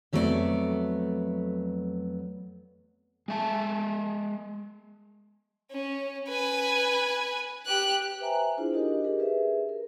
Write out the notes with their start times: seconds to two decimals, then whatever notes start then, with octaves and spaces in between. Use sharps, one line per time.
0.13 F2 F#3 A3 B3 G4 D5
3.28 G#3 E5 A5
5.71 C#4
6.29 B4 G#5
7.66 G4 F#6
8.20 B4 C5 E5 G#5 A#5
8.57 D4 E4 F4 G#4 C5
8.73 D4 D#4 F#4 G4 A#4 D#5
9.04 G4 G#4 A#4
9.19 G#4 B4 E5
9.69 A#4